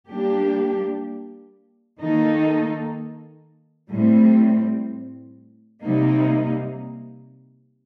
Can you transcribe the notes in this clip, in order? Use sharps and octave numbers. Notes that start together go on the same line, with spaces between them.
G3 A#3 D4 G4
D#3 A#3 D#4 A4
A2 G3 C4
C3 G3 A#3 D#4